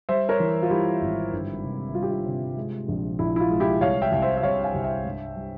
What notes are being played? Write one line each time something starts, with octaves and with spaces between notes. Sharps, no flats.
G3 C5 E5
A#4 C#5
E3
F4
G3 E4 G4
G#1
G1
C3
G3 F4
G4
F4
C3
G#3
A#1
A#1 E4
E4
F4
G#3
E4 G4
C2 C#5 F5
E5 G5
C2
C5 E5
E5
C2 C#5 F5
F5 G#5
C2
E5 G5
G2
G3